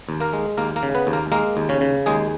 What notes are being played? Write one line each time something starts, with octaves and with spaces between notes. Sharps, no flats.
D#2
A#3 A#4
G#3
D#2 A#3 A#4
A#3 A#4
C#3
B3 B4
D#2
A#3 A#4
G#3 A#3 A#4
D#2
C#3 C#4
C#3
D#2 G#3 G#4